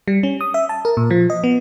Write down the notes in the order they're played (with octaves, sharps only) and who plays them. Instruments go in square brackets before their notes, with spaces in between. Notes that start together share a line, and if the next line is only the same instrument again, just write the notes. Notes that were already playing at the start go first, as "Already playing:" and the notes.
[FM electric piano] G3
C#4
D#6
E5
A5
A#4
A#2
F3
D#5
B3